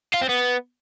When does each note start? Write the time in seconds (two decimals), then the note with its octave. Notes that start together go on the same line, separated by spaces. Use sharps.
0.14 F4
0.21 C4
0.29 B3